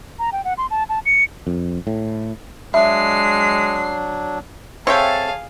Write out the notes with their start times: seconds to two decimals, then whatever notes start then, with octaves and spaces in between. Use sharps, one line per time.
0.19 A#5
0.32 G5
0.44 F#5
0.58 C6
0.71 A5
0.89 A5
1.05 C#7
1.47 F2
1.87 A2
2.74 F#3 G#3 D4 E5 C7
4.87 C4 G#4 A4 C#5 E5 F5 G5 A5